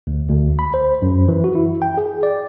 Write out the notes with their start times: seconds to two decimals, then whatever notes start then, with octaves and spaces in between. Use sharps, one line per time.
0.07 D2
0.28 D2
0.59 B5
0.74 C5
1.02 F#2
1.28 E3
1.44 F#4
1.55 E4
1.82 G5
1.98 G#4
2.23 D5